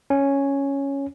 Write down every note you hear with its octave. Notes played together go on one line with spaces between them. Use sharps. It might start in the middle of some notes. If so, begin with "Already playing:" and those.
C#4